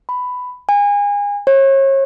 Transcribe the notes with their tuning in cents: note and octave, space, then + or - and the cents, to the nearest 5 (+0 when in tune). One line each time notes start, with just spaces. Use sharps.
B5 +10
G#5 -30
C#5 -35